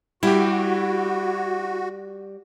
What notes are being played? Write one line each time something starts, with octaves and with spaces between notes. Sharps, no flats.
G3 E4 F#4 G4